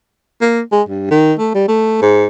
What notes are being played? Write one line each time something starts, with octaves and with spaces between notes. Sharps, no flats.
A#3
G#3
G2
D#3
A3
G3
A3
G#2